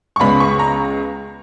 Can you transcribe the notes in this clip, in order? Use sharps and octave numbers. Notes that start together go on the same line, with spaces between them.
C#6
C#2 C#3 G#3 B3 B5
C#6
A#5